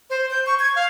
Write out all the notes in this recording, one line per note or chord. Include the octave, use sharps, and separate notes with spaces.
C5
G6
C#6
G#6
F5